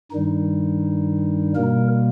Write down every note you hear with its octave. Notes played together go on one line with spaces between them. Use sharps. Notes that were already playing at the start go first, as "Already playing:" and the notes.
G2 D#3 G3 D#4
B2 G3 A#3 A#4